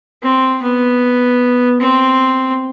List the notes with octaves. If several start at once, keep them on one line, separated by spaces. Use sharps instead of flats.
C4
B3
C4